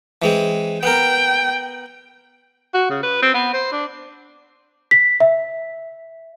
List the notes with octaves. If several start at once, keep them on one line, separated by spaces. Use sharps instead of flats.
E3 G#3 C4
B3 A#4 G5
F#4
C#3
B4
C4
B3
C5
D4
B6
E5